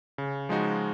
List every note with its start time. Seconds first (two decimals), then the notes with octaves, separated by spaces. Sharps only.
0.18 C#3
0.49 F3 G#3 D#4 F#4